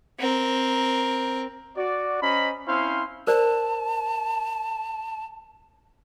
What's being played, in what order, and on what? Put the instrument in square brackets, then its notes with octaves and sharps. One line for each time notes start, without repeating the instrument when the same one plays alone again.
[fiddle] C4 A#4
[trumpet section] F#4 D5
C#4 C5 D#5 A#5 B5
C4 C#4 E4 C5 F5 C6
[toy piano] A#4 C5 D5 [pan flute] A5